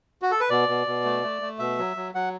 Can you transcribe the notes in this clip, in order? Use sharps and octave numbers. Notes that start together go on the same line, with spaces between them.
F#4
A4
B4
B2 D5
B2
B2
A3
A3
A3
B2 E5
F#3
F#3
F#3 F#5